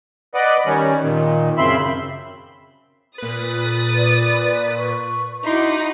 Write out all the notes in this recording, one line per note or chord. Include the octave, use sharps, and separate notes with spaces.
B4 D5 D#5 F#5
D#3 G3 C#4
A#2 D#3
F#2 C#3 C4 E5 B5 C6
A#2 B4 D#6 A6
A4
D5
C#6
D#4 E4 F#4 B5 C6 D6